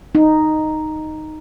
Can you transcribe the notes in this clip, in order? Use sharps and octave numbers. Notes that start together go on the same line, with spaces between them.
D#4